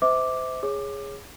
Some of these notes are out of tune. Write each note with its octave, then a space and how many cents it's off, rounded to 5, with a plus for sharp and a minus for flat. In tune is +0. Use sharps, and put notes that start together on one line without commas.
C5 -30 E5 -40 D6 +0
G#4 -10 C#5 +0 D6 +20